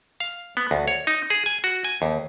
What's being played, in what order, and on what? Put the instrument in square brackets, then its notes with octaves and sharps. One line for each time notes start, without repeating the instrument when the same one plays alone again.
[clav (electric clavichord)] F5
B3
D2
C#5
D#4
G#4
G#5
F#4
G#5
D#2